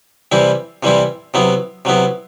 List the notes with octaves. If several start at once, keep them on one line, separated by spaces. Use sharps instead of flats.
C3 E3 G3 C4 E4
C3 E3 G3 C4 E4
C3 F#3 B3 E4
C3 F#3 B3 E4